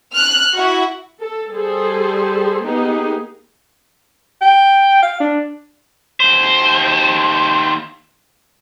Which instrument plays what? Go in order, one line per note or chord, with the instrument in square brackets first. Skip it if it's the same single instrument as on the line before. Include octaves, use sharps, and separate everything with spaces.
[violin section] F6 F#6
E4 F#4 F#5 C#6
[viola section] A4
G3 G#4 A4 C5
A#3 B3 D#4 G4 G#4
[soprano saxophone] G5
F5
D4
[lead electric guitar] D#2 C5